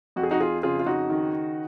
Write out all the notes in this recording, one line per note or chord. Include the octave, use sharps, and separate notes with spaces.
F2 F#4
G#4
D#4 F#4
F4 G#4
C#3 F4 G#4
F4
D#4 F#4
D#3